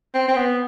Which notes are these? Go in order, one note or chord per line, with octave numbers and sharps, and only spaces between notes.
C4
C4
B3